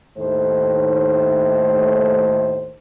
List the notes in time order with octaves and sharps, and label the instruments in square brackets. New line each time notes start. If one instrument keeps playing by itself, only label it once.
[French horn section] D#2 A2 D#3 A3 C5